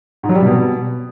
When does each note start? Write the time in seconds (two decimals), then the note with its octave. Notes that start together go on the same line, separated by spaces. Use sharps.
0.23 G#2
0.29 F#3
0.35 G3
0.40 C3
0.46 B2